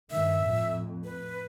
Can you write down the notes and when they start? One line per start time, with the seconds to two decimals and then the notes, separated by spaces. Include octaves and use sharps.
0.10 G2 D#3 E5
0.44 F2 A2
1.04 B4